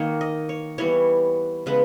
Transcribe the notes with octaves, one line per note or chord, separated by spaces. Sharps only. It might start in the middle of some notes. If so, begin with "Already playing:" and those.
Already playing: D#3 A#3 C#5
D#5
C#5
E3 G3 B3 C#5
C#3 G#3 B3 B4